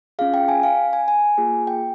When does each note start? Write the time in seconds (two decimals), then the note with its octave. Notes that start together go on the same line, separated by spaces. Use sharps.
0.19 C#4 F4 G#4 F5
0.34 G5
0.48 G#5
0.63 F5
0.93 G#5
1.08 G#5
1.38 A#3 F4 G#4
1.67 G5